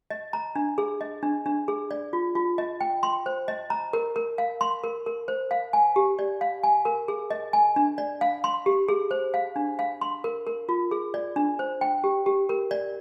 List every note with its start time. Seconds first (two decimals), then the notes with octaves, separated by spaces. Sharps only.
0.11 D#5
0.33 A#5
0.56 D4
0.78 G#4
1.01 D#5
1.23 D4
1.46 D4
1.68 G#4
1.91 D5
2.13 F4
2.35 F4
2.58 D#5
2.81 G5
3.03 C6
3.26 C5
3.48 D#5
3.70 A#5
3.93 A#4
4.16 A#4
4.38 F5
4.61 C6
4.84 A#4
5.06 A#4
5.28 C5
5.51 F5
5.73 G#5
5.96 G4
6.19 D5
6.41 F5
6.63 G#5
6.85 A#4
7.08 G#4
7.31 D#5
7.53 G#5
7.76 D4
7.98 D5
8.21 F5
8.44 C6
8.66 G4
8.88 G#4
9.11 C5
9.34 F5
9.56 D4
9.79 F5
10.01 C6
10.24 A#4
10.47 A#4
10.69 F4
10.91 G#4
11.14 D5
11.36 D4
11.59 C5
11.81 G5
12.04 G4
12.26 G4
12.49 A#4
12.71 D5